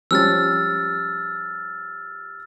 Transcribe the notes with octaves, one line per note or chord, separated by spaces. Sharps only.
F3 G3 C#4 E6 F6 A6